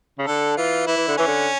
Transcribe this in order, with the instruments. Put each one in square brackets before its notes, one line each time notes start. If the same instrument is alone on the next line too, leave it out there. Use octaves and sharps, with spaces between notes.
[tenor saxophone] C#3
[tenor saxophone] D3 [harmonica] A4
[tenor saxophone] E3 [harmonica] F4
[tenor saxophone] E3 [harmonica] E4
[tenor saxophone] E3
D3
[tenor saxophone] E3 [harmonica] C#4
[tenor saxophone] D3